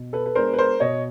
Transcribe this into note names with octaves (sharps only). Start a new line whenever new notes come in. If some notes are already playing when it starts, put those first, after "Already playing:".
Already playing: B2
A4 B4
B4
G#3 B3 D4 A#4 C5
B4
A#4 C5
B2 C#5 D#5